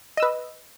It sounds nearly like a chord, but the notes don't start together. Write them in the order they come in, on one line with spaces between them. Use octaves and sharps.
D#5 E6 B4